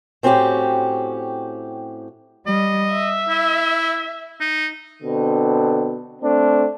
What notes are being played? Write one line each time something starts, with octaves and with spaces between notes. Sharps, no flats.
A2 C4 C#4 F#4 G4
G3 D#5
E5
E4
D#4
B2 D3 C4
A3 C4 D4